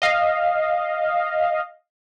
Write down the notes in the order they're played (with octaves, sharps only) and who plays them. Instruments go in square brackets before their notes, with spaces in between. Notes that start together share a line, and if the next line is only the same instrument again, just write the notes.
[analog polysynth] D#5 F5